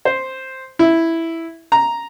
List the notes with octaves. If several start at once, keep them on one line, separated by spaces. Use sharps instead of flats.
C5
E4
A#5